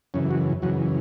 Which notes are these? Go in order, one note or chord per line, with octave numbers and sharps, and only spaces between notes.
F#2 C#3 E3 C#4
F#4
F#2 C#3 E3 F#4